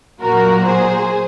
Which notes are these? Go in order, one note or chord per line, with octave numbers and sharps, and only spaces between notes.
A#2 F#3 A#3 F#4 A#4
G#4 C5